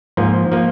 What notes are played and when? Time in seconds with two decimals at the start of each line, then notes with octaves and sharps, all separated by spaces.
0.17 G#2 F3 A#3
0.52 F3 A#3